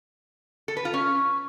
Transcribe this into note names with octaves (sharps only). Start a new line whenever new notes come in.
A4
B4
F4
C#4